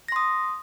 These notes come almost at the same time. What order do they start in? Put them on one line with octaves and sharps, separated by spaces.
A#6 C6 D#6